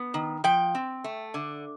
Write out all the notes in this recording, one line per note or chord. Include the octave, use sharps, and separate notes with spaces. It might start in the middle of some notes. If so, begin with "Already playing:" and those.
Already playing: B3
D#3
F3 G5
C4
A3
D3